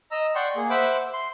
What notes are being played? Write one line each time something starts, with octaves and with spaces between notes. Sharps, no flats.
D#5 A#5 E6
D5 F#5 G5 C6 C#6
A#3 G#4
C5 E5 F#5 B5 D6
C6